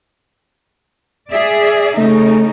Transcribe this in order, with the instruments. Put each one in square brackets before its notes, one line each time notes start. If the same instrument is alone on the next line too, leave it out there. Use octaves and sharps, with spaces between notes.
[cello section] G#4 D5 E5
[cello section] C#3 D#4 [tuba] A3